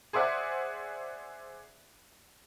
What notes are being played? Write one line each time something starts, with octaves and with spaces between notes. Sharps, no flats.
G#4 C5 D5 E5 F#5 D6